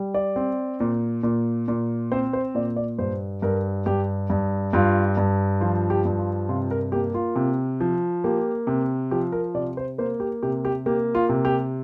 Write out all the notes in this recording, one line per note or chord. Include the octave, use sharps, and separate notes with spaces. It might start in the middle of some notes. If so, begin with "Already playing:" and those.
Already playing: G3
D5
C4
A#2
A#2
A#2
C4 C5
C5
A#2 D5
D5
G2 C5
G2 A#4
G2 G4
G2
G2 F4
G2
F3 F4
G4
G2
F4
C3 F4
A#4
A#3 G4
F4
C3
F3
A#3 G4
C3
F3 G4
A#4
C3 D5
C5
A#3 C5
G4
C3 G4
G4
A#3 G4
F4
C3
G4